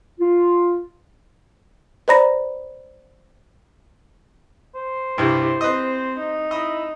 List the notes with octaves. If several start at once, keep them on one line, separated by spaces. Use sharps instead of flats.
F4
B4 C5 D5 A#5 B5 A#6
C5
C2 G2 E4 G4
C4 B4 D#5
D#4
E4 D#5